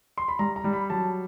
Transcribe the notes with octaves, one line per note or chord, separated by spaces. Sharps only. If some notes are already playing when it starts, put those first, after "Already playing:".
C6
B5
G3 A#5
A#5
G3
B5
F#3 A5